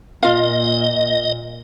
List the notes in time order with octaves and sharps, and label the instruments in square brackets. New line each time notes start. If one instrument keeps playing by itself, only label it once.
[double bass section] A#2 [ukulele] F4 F5 [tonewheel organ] D#5